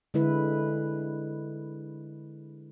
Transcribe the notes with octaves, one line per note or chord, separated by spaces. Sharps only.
D3 G#3 E4 B4